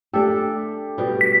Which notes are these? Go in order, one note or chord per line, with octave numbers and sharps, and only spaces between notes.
A3 D4 G4 A4
B2 G3
B6